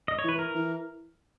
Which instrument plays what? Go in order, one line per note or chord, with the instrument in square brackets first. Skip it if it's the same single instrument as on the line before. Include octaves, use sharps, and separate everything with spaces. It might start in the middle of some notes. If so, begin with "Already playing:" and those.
[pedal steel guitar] D#5
C#5
[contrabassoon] E3 [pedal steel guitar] B4
[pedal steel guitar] A#4
[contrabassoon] E3